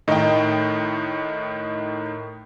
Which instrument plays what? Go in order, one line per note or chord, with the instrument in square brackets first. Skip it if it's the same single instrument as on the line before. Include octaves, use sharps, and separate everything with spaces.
[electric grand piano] A2 D#3 [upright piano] D#4 G5